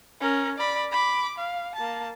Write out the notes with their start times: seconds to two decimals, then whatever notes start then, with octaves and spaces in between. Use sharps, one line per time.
0.21 C#4 A#4
0.58 D5 B5
0.91 B5 D6
1.38 F5
1.75 A#3 A5